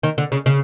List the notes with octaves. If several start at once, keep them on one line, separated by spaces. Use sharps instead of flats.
D#3
D3
C#3
C#3